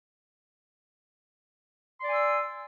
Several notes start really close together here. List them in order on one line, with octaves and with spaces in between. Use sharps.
C6 D5 G#5 E6